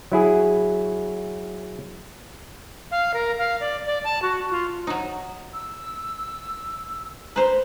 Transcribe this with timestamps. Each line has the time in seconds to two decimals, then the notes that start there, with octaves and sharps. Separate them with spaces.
0.12 F#3 E4 G#4
2.91 F5
3.14 A#4
3.38 F5
3.60 D5
3.86 D5
4.04 A5
4.22 F#4
4.51 F4
4.87 F#3 D#4
5.54 E6
7.36 B4 C5 A#5